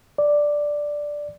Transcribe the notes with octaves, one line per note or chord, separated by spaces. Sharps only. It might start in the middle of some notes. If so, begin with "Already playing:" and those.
D5